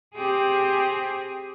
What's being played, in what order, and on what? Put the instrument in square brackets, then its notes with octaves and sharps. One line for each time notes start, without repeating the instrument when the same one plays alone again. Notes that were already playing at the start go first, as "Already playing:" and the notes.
[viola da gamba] C4 G4 G#4